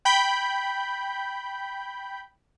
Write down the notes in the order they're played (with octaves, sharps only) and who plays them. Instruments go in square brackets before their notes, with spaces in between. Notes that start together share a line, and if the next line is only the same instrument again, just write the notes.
[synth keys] G5 B5 G6